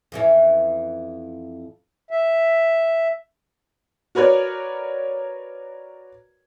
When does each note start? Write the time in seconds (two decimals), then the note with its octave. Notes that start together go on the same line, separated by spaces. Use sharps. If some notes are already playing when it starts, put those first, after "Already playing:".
0.12 F2 E3 C#4
2.11 E5
4.15 F#4 A#4 B4 C#5 D5